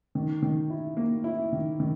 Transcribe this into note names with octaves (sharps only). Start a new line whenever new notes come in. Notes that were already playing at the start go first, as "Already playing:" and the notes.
D#3
D#3
E4
A#3
E4
D#3
D#3